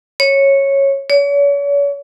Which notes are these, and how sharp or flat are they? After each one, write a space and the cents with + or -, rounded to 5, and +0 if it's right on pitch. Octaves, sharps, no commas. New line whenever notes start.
C#5 -10
C#5 +40